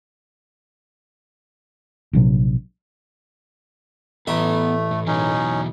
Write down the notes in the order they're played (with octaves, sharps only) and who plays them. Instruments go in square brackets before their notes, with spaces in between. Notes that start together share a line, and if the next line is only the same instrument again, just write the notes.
[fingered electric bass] A#1 C3 F#3
[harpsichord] A1 E5 D#6 [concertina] A3 [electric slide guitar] B3 B4 A#5
[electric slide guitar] A2
[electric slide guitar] B2 E3 F#3 [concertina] C#4 D#4